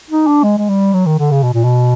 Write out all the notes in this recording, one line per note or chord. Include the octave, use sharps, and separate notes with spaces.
D#4
D4
G#3
G#3
G3
F#3
D#3
D3
C#3
B2
A#2
B2